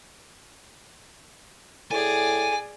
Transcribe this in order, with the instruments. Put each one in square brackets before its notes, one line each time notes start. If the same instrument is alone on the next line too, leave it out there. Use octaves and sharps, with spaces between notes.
[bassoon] A2 [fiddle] G#4 D5 [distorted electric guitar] G#5